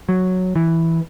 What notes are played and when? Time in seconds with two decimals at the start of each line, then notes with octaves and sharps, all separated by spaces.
0.09 F#3
0.56 E3